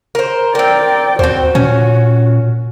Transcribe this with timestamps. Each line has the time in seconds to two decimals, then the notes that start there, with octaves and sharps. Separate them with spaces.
0.15 A#4 C5
0.55 C4 A#4 D5 G5
1.19 D#2 C4 F#4 C5
1.55 A#2 C#4